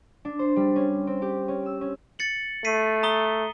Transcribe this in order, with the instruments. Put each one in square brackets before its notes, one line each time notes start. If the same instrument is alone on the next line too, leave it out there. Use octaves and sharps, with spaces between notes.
[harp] D4
C5
G3
C#4
C4
G4
C#4
E6
C#4
[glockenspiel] A6 C#7 F#7
[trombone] A3 [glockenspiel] B6 C7 D#7
[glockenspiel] A#5 D#6 G7